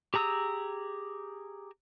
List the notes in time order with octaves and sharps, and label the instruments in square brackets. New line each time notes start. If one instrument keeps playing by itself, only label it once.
[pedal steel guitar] G4 G#4 A#5 D#6 E6